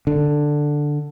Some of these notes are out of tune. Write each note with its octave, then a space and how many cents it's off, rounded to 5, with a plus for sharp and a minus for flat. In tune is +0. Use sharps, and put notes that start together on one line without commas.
D3 +5